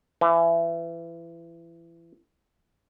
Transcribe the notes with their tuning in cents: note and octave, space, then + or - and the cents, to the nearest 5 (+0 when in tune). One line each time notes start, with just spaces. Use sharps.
E3 +25